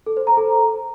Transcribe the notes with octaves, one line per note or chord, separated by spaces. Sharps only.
A4
C5
A#5
A4